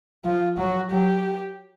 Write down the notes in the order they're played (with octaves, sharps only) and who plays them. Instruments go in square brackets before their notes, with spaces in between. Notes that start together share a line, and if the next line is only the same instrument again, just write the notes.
[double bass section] F3 [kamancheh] F4
[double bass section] F#3 [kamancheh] F#4
[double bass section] F#3 [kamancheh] G4